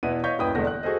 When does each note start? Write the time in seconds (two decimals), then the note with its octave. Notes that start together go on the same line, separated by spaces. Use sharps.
0.03 E2 B2 B3 E4 B4 D#7
0.23 C#5 D#5 F5 C#6 G6 B6
0.38 D#1 F#2 E4 B4 G5 D#6
0.55 E1 E2 D3 G#3 A3 A#6
0.67 F#6
0.83 F#4 G#4 A4 C5 D#5